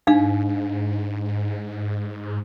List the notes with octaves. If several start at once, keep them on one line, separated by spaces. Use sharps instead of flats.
G#2 D4 D#4 F5